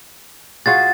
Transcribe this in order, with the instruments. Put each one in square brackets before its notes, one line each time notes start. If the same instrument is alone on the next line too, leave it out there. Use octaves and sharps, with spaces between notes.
[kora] F4 F#4 G#4 [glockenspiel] A6